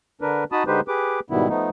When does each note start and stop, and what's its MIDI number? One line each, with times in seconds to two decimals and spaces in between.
0.21 0.44 50
0.21 0.44 62
0.21 0.44 70
0.21 0.44 71
0.52 0.63 63
0.52 0.63 66
0.52 0.63 81
0.52 0.63 83
0.52 0.63 87
0.67 0.81 50
0.67 0.81 56
0.67 0.81 63
0.67 0.81 67
0.67 0.81 71
0.67 0.81 72
0.88 1.20 67
0.88 1.20 68
0.88 1.20 71
0.88 1.20 86
1.30 1.48 44
1.30 1.48 47
1.30 1.48 51
1.30 1.48 55
1.30 1.48 59
1.30 1.48 64
1.49 1.70 53
1.49 1.70 57
1.49 1.70 59
1.49 1.70 63